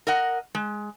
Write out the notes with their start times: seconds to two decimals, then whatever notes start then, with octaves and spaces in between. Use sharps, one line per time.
0.07 A#4 D#5 F#5
0.55 G#3